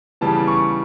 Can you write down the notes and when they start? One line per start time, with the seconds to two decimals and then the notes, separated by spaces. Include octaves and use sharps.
0.21 C#3 E3 G3 B3 A5
0.48 C#6